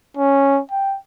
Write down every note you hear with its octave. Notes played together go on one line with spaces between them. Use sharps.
C#4
G5